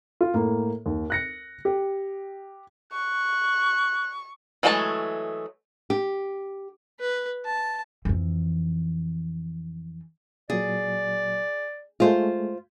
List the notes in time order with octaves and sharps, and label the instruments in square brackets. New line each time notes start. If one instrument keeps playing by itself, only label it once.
[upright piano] F4
A2 A#3
D#2
F#6 A#6 C#7
G4
[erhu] C#6 [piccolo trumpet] F#6
[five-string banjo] E3 F#3 G#3 A3 A5
[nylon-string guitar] G4
[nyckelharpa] B4
A5
[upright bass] F2 E3
[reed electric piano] A#2 F#3 [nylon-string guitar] G#4 [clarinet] D5
[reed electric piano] G#3 A3 [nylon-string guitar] F4 C5